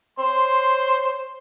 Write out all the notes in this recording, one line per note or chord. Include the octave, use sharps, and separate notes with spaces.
C5 C#5 C6